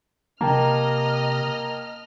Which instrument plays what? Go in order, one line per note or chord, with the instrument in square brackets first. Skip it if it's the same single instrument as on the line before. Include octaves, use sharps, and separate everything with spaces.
[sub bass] C3 [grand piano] A#3 [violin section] D#5 F6 [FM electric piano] G5 A5 A#5